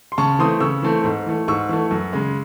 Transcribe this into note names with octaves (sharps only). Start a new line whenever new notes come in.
C6
C#3 A5 C#6
E3 A3 C4 C6 D#6
C#3 C#6 E6
E3 A3 C4
G#2
E3 A3
G#2 C#6 E6
E3 A3
F#2
C#3 G#3